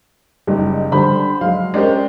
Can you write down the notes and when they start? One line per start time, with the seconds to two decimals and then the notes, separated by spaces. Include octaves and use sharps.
0.47 F#1 G3 D#4
0.92 D3 G3 C5 B5
1.41 F#3 G#3 F5
1.74 G#3 C#4 G4 A#4 C5 D5